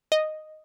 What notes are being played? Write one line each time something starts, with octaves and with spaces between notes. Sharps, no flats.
D#5